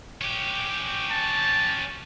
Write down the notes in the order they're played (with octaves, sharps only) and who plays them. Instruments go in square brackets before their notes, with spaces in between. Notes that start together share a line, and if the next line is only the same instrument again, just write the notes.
[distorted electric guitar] C#4 G4
[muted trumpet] A5